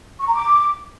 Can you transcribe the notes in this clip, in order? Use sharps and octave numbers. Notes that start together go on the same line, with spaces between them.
C#6
A#5
D6